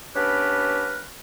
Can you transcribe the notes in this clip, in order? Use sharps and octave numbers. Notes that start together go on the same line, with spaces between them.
B3 C#4 D4 G4 A#4 B4